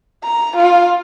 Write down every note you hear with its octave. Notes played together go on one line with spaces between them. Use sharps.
A#5
F4